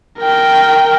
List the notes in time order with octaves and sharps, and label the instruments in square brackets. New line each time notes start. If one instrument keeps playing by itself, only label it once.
[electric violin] A#4 G5